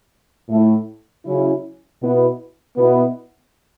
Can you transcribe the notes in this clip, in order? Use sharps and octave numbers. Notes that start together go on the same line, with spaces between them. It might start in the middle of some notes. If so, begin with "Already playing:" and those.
A2 A3 E4
C#3 F#3 C#4 E4
B2 B3 E4
B2 B3 E4